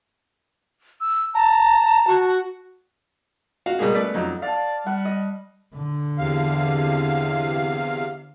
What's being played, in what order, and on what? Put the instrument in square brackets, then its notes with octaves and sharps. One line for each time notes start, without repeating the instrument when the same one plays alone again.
[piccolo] E6
[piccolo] A5 [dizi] A#5
[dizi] F#4
[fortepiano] F#4 F5
B2 G3 G#3 A#3 G#4
A3 B3 B4 D5
F2 F#3 D#4
[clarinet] D5 [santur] F5 A5
[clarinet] G3 [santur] F#5
[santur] D#5
[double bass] D3
[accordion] E2 C3 F5